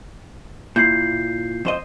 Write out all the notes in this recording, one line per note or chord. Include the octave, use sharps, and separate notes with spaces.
A#2 E4 G6 C7
F2 C5 D#5